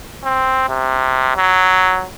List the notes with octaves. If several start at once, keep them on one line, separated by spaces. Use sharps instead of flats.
C4
C3
F#3